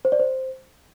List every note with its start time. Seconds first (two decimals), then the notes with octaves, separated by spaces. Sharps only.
0.05 C5
0.12 D5
0.20 C5